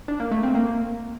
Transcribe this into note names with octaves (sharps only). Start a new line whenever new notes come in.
D4
A#3
A3
C4
A#3